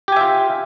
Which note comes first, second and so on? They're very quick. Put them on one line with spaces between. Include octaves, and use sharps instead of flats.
G4 G#5 E5 F4